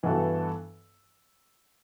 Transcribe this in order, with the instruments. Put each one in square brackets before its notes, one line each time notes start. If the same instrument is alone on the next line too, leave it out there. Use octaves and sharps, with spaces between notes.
[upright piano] G2 E3 B3 F#4 A4